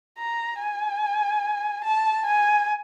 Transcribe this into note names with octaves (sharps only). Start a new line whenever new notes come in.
A#5
G#5
A5
G#5